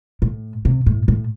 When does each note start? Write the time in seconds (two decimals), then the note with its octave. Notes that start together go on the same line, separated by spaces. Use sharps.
0.22 A2
0.65 C3
0.86 A2
1.08 A2